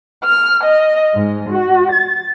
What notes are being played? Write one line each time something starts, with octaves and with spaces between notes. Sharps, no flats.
F6
D#5
G#2
F#4
A6